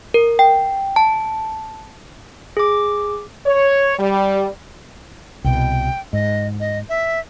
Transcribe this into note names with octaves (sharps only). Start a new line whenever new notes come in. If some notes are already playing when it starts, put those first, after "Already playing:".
A#4
G5
A5
G#4 D6
C#5
G3
C2 B2 G5
G#2 D#5
D#5
E5